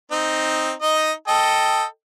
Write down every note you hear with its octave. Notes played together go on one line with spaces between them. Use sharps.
C4 D#4
D#4 D#5
A4 D#5 G5